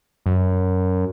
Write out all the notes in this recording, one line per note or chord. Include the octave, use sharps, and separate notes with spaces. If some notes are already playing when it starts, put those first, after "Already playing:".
F#2